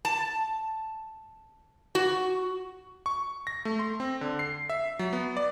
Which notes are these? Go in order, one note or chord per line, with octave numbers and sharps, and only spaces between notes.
A5
F#4
C#6
A#6
A3
C6
C4
D3
C7
E5
F#3
B3
D5